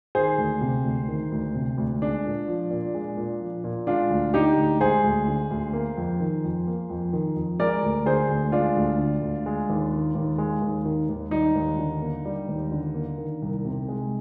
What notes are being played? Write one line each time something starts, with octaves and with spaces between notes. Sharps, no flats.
D#3 G#4 C5
D2
C3
D2
D#3
D2
C3
D2
G#3 D4
A#2
F3
A#2
G#3
A#2
F3
A#2
G#3 D4 F4
D2
D3 D#4 G4
D2
G#3 G#4 C5
D2
D3
D2
A#3
F2
D#3
F2
A#3
F2
D#3
F2
G#3 A#4 D5
D2
D3 G#4 C5
D2
G#3 D4 F4
D2
D3
D2
G#3
D#2
D#3
D#2
G#3
D#2
D#3
D#2
G3 D#4
D#2
D3
A#3
G3
D#2
D3
A#3
D#3
C2
C3
G#3